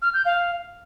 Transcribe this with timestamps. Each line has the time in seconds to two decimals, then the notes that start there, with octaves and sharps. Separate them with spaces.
0.02 F6
0.14 G6
0.25 F5